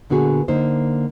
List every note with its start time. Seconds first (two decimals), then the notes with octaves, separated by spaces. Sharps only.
0.10 A#2 D3 B3 F#4 G#4
0.48 D3 A#3 D#4 C5